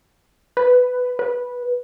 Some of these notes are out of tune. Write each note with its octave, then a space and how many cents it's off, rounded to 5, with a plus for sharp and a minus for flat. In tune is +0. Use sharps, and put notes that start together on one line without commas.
B4 +10
B4 -10